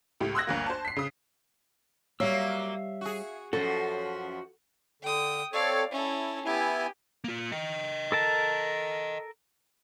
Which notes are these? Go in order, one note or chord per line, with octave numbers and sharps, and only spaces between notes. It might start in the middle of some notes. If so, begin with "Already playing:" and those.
C#2 A2 G4
C6 D#6 E6 F#6 G#6 A#6
G1 D2 A#3
C5 A5
B6 C7
C#3 D#6
F#3 G3 A#3 C#5 E5 F5 E6
F#4 G#4
F#2 F3 F#4 A4
D3 G5 D#6
C4 A4 C#5 D5 F5
C#4 E4 A4
B3 E4 G4 G#5
A#3 F4
D#5 G5
A4 A#4 A5